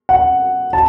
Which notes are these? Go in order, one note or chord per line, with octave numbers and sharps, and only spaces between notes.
F#5
A5